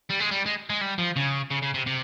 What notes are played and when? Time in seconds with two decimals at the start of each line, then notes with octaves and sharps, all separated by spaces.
0.10 G3
0.20 G#3
0.31 G3
0.46 G#3
0.70 G#3
0.81 G3
0.98 F3
1.16 C#3
1.51 C#3
1.62 C#3
1.74 C3
1.87 C3